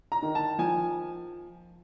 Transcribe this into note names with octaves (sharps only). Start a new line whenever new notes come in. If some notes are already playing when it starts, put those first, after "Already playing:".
A#5
D#3
A5
F3 G#5